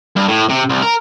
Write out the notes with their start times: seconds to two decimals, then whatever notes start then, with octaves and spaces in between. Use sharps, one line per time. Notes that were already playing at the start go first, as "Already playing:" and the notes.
0.16 G2
0.28 A2
0.50 C3
0.70 C2
0.83 A#4